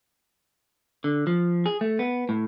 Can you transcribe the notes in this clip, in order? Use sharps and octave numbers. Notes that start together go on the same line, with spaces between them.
D3
F3
G#4
A3
B3
A2